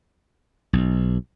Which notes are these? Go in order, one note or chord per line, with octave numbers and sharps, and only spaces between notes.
B1